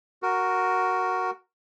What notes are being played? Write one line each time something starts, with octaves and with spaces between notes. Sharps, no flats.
F#4 A#4